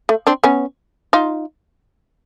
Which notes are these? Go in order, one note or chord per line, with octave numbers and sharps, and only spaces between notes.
A3
C4 D4
B3 C#4
D#4 F4